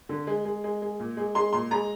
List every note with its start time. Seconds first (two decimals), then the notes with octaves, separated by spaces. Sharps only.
0.09 D3
0.27 G#3
0.45 G#3
0.64 G#3
0.82 G#3
1.00 A#2
1.17 G#3
1.35 G#3 C6
1.53 A#2 C6
1.71 G#3 A#5